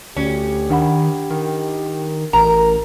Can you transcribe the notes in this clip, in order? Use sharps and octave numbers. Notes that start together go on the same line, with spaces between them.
D2 C#4 G4
D#3 D4 F#5 B5
D#3
A1 A#4 A#5